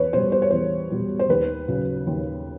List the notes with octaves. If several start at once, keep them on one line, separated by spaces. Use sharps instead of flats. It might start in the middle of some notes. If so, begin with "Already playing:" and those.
Already playing: E2 B4 C#5
B2 G3 C5
C5
C#5
E2 C5
B2 G3
C5
D#2 B4
C#3 F#3
D#2